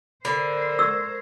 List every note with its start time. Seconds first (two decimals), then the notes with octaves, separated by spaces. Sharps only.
0.25 D3 A#4 C5 B5
0.79 C#6 E6 G#6